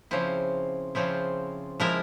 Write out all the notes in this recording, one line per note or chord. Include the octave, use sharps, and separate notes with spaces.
C#3 F3 C4 E4
C#3 F3 C4 E4
F3 G#3 E4 A#4